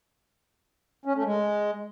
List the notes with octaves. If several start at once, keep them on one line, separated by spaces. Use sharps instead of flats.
C#4
A3
G#3